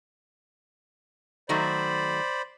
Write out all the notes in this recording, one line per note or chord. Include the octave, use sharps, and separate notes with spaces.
D#3 F#3 A3 C5 D5 B5